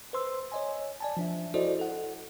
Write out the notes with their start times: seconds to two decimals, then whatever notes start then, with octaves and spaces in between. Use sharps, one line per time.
0.13 B4 C5 C6 E6
0.52 C#5 D#5 G#5
1.00 D5 G#5 A5
1.17 F3 D4 E5
1.54 E4 F#4 A4 C5 D5 D#5
1.79 A4 F#5